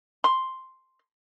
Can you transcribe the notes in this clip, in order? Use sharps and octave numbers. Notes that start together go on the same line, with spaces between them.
C6